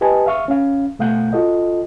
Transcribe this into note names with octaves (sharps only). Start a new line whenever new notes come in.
G4 B4 D#5 G#5 A5
E5 F5 C#6 F6
C#4 F5
B2 A3 F5 F#5 G6
F4 F#4 A4 D#5